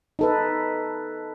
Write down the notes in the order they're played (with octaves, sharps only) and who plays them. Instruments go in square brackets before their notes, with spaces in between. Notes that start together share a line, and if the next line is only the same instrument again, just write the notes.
[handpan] D#4 A4 B4